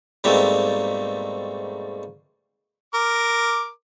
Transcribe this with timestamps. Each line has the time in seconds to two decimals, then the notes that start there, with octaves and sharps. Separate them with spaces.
0.24 G#2 B2 G3 A3 A#3 C4
2.94 A#4 D6